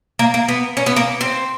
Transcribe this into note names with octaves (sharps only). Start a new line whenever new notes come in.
A#3
A#3
B3
C#4
B3
A#3
C4